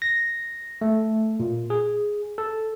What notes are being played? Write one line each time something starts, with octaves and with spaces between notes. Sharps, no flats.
A#6
A3
A#2
G#4
A4